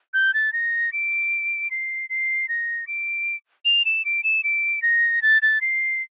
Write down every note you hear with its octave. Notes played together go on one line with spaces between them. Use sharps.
G6
A6
A#6
D7
C7
C7
A#6
D7
F7
E7
D7
E7
D7
A#6
A6
A6
C7